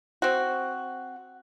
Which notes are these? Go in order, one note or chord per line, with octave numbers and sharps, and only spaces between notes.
C4 F#4